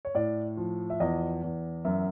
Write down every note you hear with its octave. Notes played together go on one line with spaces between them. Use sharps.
C#5
A2 D5
F3
E5
E2 D#5
E2
F#2 E5